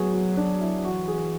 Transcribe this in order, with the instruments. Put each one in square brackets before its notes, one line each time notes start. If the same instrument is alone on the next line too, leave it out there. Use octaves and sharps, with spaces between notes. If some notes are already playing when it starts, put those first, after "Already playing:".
Already playing: [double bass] F#3 [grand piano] A3 B3 F#4 G#4
[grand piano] F#4
D4
E4
[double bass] E3 [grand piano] F#4
[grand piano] G#4